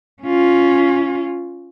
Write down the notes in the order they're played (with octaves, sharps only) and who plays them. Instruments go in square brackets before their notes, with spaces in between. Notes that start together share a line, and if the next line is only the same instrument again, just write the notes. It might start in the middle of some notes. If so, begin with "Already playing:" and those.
[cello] C#4 F4